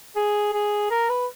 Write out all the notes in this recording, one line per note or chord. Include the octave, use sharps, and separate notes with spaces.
G#4
G#4
A#4
B4